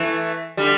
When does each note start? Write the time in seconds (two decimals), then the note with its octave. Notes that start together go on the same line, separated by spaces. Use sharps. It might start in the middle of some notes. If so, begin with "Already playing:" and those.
Already playing: E3 A3
0.57 D3 G3